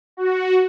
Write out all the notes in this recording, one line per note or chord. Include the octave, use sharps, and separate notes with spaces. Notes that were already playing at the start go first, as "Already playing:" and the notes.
F#4